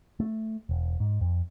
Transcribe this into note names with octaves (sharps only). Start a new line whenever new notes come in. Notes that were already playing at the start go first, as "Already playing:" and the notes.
A3
E1
G#2
F2